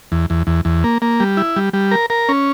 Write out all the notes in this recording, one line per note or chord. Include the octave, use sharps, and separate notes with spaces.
E2
E2
E2
E2
A#3
A#3
G3
E4
G3
G3
A#4
A#4
C#4